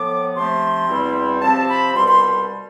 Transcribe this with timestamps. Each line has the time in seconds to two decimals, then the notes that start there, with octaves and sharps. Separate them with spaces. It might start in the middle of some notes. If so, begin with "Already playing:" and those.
Already playing: A2 F3 B3 D6
0.35 C3 F3 A3 C6
0.88 E2 B2 G3 C4 E4
1.41 C3 F3 C4 A5
1.68 B5
1.94 C2 B2 G3 C6
2.07 C6